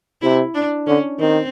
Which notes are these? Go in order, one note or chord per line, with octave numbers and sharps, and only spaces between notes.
C3 E4
D4
D3 C#4
D#3 C4